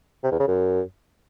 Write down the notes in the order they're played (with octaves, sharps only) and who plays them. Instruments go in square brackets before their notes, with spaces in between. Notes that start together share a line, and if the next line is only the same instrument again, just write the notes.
[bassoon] C3
E2
C#3
F#2